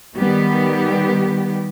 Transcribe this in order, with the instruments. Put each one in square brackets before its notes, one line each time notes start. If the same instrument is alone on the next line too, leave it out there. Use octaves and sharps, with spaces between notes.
[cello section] D#3 G3 B3 G4